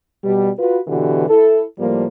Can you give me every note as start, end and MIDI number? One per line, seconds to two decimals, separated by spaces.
0.24 0.50 47
0.24 0.50 55
0.60 0.79 65
0.60 0.79 66
0.60 0.79 71
0.88 1.26 47
0.88 1.26 50
0.88 1.26 52
0.88 1.26 66
0.88 1.26 67
1.29 1.65 64
1.29 1.65 69
1.79 2.05 45
1.79 2.05 53
1.79 2.05 55
1.79 2.05 58